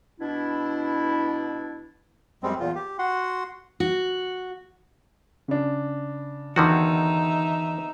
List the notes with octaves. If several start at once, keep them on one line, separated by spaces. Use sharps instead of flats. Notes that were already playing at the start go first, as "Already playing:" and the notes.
B2 D4 E4
F#2 G3 G#3 C4
E2 A#2 F4
G4
F#4 F#5 C6
F#4
C#3 D4
E2 D3 D#3 D#4 F#4 E5